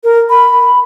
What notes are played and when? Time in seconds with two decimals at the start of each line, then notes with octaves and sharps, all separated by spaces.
0.04 A#4
0.30 B5